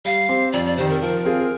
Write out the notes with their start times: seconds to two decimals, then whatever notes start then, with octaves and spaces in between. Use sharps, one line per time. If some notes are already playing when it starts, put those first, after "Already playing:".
0.05 G3 F5
0.29 C4 G4 C5
0.52 F2 D5
0.65 D5
0.77 C3 D#3 C5
0.89 A#4
1.01 F3 A#4
1.25 C4 F4 G#4